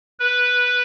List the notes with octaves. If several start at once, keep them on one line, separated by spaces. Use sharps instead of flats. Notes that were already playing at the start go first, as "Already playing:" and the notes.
B4